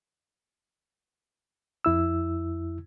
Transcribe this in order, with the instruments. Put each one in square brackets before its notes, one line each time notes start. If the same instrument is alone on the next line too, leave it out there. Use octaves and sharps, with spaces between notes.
[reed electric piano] F2 E4 E6